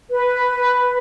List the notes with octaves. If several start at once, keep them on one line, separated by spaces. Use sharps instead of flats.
B4